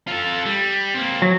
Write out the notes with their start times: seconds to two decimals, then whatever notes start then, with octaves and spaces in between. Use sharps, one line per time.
0.07 F4 A4
0.45 G3
0.94 A#3 C4
1.22 F#3